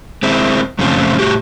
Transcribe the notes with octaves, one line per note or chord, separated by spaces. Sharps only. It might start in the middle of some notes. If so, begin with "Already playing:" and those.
G#3 C4 E4
F#2 C#3 F3 A3 C4 F4
A2 F#4 G4